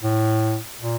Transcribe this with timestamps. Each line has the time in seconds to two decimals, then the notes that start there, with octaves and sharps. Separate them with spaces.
0.03 A2
0.81 A#2